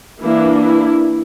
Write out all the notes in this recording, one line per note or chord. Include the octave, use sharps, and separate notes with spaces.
E3 A#3 D4 E4
E4